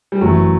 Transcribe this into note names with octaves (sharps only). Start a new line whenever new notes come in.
G3
G1 F#2 E3 F#3 A3